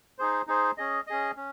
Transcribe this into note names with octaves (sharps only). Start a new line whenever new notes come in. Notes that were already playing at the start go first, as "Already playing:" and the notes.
D#4 G#4 C5
D#4 G#4 C5
C#4 G#4 D#5
C#4 G#4 D#5
C#4